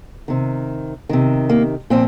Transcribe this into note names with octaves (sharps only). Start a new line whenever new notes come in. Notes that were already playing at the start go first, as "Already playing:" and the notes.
C3 D#3
C3 D#3
A#3
A#2 F3 C4